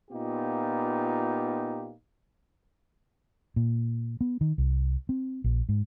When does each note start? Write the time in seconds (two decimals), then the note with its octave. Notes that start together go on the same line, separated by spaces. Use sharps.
0.11 A#2 B3 D#4 F4 G4
3.56 A#2
4.21 B3
4.41 D#3
4.58 C2
5.09 C4
5.44 A#1
5.69 G#2